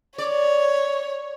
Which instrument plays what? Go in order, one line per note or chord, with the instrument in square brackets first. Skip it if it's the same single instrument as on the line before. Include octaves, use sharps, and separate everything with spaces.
[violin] C#5 [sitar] D5